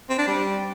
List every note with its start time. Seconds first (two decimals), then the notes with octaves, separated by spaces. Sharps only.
0.09 C4
0.18 D4
0.27 G3